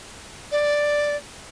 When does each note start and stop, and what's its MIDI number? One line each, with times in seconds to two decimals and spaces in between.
0.51 1.16 74